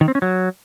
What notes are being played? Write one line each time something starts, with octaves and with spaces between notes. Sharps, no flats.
D#3
C4
C#4
F#3